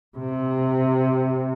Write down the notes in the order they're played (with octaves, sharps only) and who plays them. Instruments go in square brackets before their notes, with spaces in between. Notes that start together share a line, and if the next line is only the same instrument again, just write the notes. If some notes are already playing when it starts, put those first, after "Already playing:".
[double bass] C3